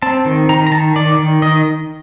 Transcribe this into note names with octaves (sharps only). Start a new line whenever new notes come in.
C4 A5
D#3
D#3 A#5
A#5
D#3 A5
D#3 D5
D#3
D#3 D#5